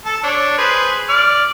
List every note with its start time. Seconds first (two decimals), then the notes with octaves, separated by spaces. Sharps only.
0.06 A4 A5
0.24 D4 C#5
0.58 G#4 B4 C5
1.09 D5 F6